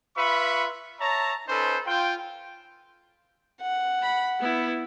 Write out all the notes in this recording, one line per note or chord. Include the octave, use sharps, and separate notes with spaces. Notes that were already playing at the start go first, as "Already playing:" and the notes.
F4 B4 E5 B5 C#6
C#5 E5 A5 A#5
C#4 D#4 A4 B4 C5
F4 G5
F#5
B5
B3 E4